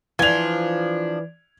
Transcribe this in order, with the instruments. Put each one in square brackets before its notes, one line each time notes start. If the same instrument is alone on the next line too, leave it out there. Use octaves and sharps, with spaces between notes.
[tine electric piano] E3 [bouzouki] F3 D4 [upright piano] G#6 F7